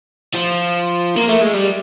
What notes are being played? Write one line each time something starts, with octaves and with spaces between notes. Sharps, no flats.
F3
A#3
A3
G#3
G3